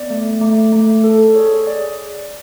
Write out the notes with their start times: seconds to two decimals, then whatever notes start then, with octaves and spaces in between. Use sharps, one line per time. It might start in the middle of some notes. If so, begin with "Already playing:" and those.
Already playing: B3 D5
0.10 A3
0.41 A3
0.72 A3
1.04 A4
1.35 G#4 C#5
1.67 G#4 D5